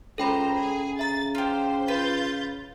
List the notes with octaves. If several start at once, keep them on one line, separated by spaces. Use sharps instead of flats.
C#2 A4 C5 G5 A#5 B5
C#3 G#4
E5 A#5 A6
F4 G4 C5
F4 B4 G6 A6